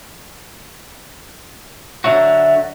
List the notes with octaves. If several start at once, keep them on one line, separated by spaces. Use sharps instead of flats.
D3 F#3 F#4 E5